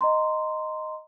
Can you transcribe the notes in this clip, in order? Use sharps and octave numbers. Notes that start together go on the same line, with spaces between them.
D#5 A#5 C6